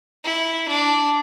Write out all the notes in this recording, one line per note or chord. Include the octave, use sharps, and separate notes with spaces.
E4
D4